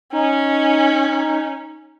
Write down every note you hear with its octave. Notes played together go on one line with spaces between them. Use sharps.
C#4 D#4